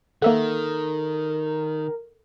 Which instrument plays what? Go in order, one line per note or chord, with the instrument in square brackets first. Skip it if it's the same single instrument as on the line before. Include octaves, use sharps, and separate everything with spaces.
[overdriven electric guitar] D#3 [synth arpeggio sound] A#3 E5 F#5 [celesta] A4 [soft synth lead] A#4